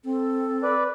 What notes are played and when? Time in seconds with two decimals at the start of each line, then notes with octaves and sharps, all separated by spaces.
0.04 C4 A4
0.63 B4 D5